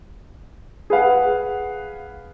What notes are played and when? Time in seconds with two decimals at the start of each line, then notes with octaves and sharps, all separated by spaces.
0.90 G#4 B4 F5 F#5